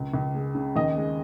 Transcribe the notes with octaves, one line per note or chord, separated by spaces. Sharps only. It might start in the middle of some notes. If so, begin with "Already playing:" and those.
Already playing: C#2
C#2
G#3
C#3
D#2 D#5
G#3